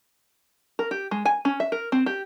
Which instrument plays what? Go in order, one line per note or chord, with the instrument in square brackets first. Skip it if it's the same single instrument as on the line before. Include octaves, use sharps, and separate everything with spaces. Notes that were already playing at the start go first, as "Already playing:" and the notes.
[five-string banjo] A#4
G4
G#3
G#5
C#4
E5
A#4
C4
G4